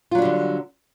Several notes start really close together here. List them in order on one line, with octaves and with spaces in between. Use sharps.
F4 F#3 D4 G3 D3